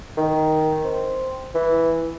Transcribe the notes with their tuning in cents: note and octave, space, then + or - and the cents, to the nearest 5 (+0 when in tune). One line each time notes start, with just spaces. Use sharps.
D#3 +5
C4 -5
E3 -5